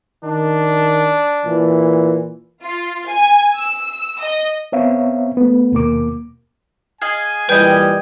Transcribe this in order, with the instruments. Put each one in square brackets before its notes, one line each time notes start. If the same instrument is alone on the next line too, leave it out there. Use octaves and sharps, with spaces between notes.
[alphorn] D#3 [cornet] D4
[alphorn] A#2 [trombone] E3
[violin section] F4
G#5
E6
D#5
[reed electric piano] B3 C4 C#5 E5 F5
A3 B3
D#2 B2 A#3 D6
[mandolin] G#4 D#5 F5 [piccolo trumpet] G#5
[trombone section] A#2 E3 G3 [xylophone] B4 G6 [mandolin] D#5 G5